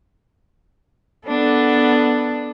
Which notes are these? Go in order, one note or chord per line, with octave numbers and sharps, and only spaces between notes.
B3 D4 A4